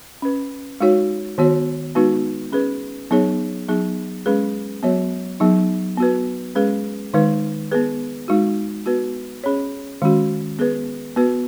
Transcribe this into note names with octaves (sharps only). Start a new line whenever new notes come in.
C#4 B4
G#3 D#4 F#4 C#5
D#3 B3 F#4 C#5
G#3 B3 D#4 F#4 B4
C#4 G#4 B4
F#3 B3 D#4 G#4 C#5
F#3 B3 D#4 G#4
G#3 C#4 G#4 B4
F#3 B3 F#4 C#5
F#3 B3 D#4 G#4
B3 F#4 B4
G#3 C#4 G#4 B4
D#3 G#3 D#4 B4
B3 G#4 B4
G#3 D#4 F#4
B3 F#4 B4
C#4 G#4 C#5
D#3 G#3 C#4 F#4
B3 G#4 B4
B3 F#4 B4